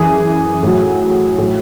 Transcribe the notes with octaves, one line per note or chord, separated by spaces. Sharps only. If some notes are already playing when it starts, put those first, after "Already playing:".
Already playing: F#2 E3 G#4
A2 F#3
A2 F#3